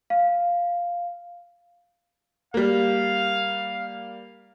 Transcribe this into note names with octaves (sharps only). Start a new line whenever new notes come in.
F5
G3 A#3 F5